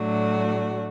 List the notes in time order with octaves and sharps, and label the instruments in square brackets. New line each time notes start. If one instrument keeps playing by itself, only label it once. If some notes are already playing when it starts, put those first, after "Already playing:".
Already playing: [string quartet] A2 F#3 A3 D4 F#4